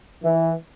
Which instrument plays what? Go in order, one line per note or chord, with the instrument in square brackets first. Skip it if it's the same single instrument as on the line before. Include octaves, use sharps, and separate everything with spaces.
[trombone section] E3